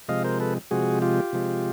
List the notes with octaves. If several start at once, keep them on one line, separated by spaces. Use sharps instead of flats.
C3 F3 G#3 D#5 F5
A#4 C5
A4 B4
C3 F3 G#3 F#4 G#4
F4 G4
C3 F3 G#3